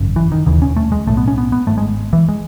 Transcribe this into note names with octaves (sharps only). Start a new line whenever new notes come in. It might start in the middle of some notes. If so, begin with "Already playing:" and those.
Already playing: G#1 F#2 C#3
E3
D#3
E1 D#2 C#3 E3
C#4
A3
G#3
B1 A2 A3
B3
C#4
B3
B3
G#1 G#2 A3
G#3
E3
G#3